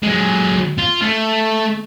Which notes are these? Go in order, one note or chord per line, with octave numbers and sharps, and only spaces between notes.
F#3 G#3
F4
A3